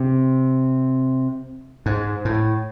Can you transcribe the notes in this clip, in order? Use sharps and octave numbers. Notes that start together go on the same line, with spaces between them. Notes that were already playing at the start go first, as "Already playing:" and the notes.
Already playing: C3
G#2
A2